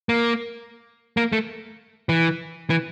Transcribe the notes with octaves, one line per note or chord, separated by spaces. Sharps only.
A#3
A#3
A3
E3
E3